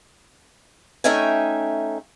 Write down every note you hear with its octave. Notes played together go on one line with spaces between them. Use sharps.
A3 C#4 D#4 E5 G5 G#5